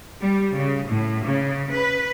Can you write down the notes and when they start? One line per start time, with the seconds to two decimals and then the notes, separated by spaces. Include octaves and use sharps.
0.21 G3
0.56 C#3
0.88 A2
1.26 C#3
1.74 B4